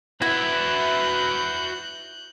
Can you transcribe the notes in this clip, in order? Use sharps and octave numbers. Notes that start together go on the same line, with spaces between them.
E4 F#4 B4 E5 F#6 G6